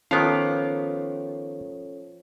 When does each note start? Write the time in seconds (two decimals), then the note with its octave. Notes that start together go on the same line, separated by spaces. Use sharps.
0.11 D#3 F3 B3 C#4 A4 C#5 F5 D6